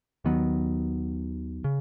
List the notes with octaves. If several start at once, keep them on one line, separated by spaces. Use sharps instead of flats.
D#2 D#3 F#3 B3
C#3